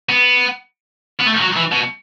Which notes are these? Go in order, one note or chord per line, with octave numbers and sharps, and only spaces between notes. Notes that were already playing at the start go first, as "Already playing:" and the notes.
B3
B3
A3
F#3
E3
B2